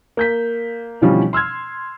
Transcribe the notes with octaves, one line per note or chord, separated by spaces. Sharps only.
A#3 G6 B6
B2 D3 E3 F3 G3 C#4
C6 E6 F6 G#6